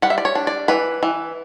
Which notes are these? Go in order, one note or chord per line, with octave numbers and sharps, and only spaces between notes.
G3 F#5
E5
D5
C#5
D4
D5
E3 B4
E3